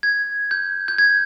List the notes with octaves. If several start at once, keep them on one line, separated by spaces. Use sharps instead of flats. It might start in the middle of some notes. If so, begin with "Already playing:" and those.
G#6
G6
G6
G#6